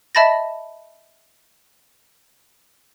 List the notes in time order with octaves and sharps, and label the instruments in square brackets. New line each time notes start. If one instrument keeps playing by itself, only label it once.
[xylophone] D#5 E5 A5 B5 A6 A#6